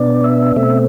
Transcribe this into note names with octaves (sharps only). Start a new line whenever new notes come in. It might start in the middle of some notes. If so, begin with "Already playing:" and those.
Already playing: B2 B3 D4 D5
E5
B2 A3 C4 E5